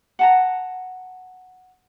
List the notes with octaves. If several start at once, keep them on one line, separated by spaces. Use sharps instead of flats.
F#5 A5 A#5